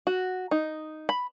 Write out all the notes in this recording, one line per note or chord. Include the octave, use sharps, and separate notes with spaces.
F#4
D#4
B5